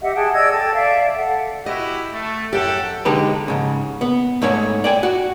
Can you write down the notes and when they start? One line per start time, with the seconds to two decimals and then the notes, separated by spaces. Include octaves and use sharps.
0.01 G4 D#5 E5 F#5
0.15 G#4 F#5 G5 A5
0.33 D5 D#5 E6 G#6
0.52 A4 G5 A5
0.73 D5 E5 F5
1.17 A4 F#5
1.66 E4 F#4 G4 D#5
2.13 A3
2.53 F#2 G4 A4 F#5 G5
3.05 D3 G#3 D#4 G4 B4
3.48 G#2 C#3
4.01 B3
4.42 G#2 A3 C#5 G#5
4.84 D5 G5 G#5
5.03 F#4